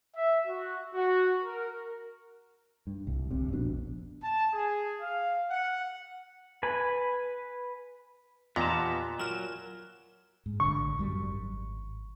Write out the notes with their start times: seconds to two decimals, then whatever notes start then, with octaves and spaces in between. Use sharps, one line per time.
0.14 E5
0.46 F#4
0.94 F#4
1.43 A#4
2.87 G2
3.07 C2
3.31 G1 C2 C3
3.52 F1 A#1 B2 D4
4.22 A5
4.53 G#4
5.01 F5
5.50 F#5
6.63 B4 G#5 B5
8.56 E2 A#2 B3 F4 G4 D#5 A5 A#5
9.19 F#3 A#4 E7
10.46 G#2
10.60 A1 D3 C#6
10.98 F#1 F#2 G3
11.23 G#1